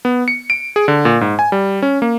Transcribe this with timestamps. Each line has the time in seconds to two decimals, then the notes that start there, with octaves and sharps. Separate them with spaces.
0.05 B3
0.28 C#7
0.50 D7
0.76 G#4
0.88 D3
1.05 A#2
1.21 G#2
1.39 G#5
1.52 G3
1.82 C#4
2.02 A#3